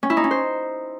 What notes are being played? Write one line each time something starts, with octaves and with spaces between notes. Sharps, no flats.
C#4
E4
D#4
C#4
C5